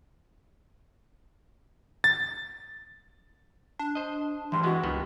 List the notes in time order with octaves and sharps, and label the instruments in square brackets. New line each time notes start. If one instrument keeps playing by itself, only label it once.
[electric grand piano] A6
[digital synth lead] D4
[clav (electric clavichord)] C5 D#5
[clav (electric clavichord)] D2 G2 [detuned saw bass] E3 [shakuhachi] C6
[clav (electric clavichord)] C#2 G#3 B3 [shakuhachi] F#4
[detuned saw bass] C#2 [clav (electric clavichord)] G2 D#3 B3